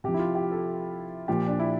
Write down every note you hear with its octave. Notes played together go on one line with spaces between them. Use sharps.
C3 F3 G4
E4
F4
G4
A4
A#2 F3 G4
D4
E4